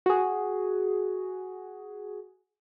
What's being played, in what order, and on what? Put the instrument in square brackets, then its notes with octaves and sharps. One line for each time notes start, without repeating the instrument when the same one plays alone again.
[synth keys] F#4 G#4